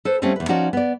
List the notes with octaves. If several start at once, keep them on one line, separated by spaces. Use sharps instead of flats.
A4 B4 C5
G3 A3 A#3 C4 C#4
E2 B4
F3 C#4 D#4 F#4 A#4 D5
B3 D5